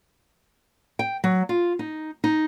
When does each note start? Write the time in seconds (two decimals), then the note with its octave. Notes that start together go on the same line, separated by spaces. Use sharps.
0.99 G5
1.24 F#3
1.49 F4
1.79 D#4
2.24 D#4